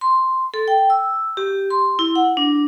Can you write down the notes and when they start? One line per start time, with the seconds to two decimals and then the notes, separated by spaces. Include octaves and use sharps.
0.01 C6
0.54 A4
0.68 G5
0.90 E6
1.37 G4
1.70 C6
1.99 E4
2.16 F#5
2.37 D4